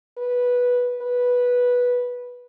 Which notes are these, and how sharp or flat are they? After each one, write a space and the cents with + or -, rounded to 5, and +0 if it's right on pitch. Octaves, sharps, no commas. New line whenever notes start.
B4 -10
B4 -10